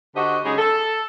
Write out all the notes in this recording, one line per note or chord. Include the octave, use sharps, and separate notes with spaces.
D3 F#4 G4 C5 D#5
C#3 F#3 G#3 D#4 G#4
A4